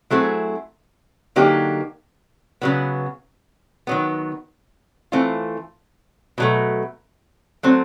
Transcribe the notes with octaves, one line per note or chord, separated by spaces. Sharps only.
F#3 A3 C4 E4 G#4
D3 F#3 A#3 D#4 G4
C#3 F#3 B3
D#3 F#3 B3
E3 A3 C4 F4
B2 F#3 A3
F#3 A3 C4